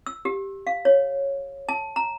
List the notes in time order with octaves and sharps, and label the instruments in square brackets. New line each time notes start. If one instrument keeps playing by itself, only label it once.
[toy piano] E6
G4
F5
C#5
A5
A#5